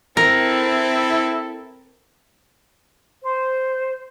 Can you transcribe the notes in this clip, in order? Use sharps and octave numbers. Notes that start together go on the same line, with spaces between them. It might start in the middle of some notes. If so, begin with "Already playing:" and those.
C4 E4 A4 A#4
C5